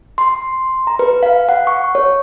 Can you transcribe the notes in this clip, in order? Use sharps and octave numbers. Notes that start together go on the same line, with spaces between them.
C6
A#5
B4
F5
F#5
C#6
C#5